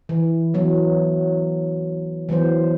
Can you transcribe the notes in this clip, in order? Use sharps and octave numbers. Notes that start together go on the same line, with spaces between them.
E3
E3 F#3 B3
E3 F#3 B3 C5